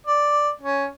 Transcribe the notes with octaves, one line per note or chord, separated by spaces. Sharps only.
D5
C#4